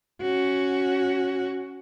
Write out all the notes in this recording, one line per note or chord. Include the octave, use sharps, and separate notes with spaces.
C#4 F#4